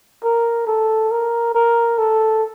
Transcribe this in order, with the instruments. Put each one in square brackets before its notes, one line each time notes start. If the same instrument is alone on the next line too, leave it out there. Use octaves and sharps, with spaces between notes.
[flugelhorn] A#4
A4
A#4
A#4
A4